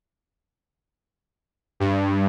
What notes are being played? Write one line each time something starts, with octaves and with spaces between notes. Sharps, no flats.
G2